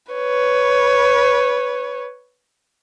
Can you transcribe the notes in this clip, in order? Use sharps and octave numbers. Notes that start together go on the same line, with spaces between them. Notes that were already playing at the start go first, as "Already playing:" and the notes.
B4 C#5